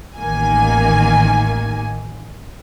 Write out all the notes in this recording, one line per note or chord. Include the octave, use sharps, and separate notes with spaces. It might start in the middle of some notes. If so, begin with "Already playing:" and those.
A1 D#3 A#3 G#5